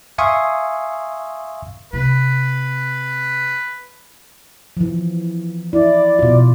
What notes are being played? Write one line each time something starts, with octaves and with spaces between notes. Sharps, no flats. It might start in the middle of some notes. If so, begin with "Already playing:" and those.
E5 F5 G#5 C6 C#6 D#6
C3 B4
E3 F3
E4 D5
B2 F4